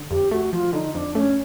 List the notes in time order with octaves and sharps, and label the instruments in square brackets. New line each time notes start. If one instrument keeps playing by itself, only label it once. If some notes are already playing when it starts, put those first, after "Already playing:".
Already playing: [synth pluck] D3
[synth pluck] F2 [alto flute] G4
[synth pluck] A3 [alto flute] F#4
[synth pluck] F3 [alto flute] F4
[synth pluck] D3 [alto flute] D#4
[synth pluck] F2 [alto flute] D4
[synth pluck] A3 [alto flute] C#4